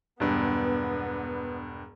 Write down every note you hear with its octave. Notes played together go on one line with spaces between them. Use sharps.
E1 G2 B3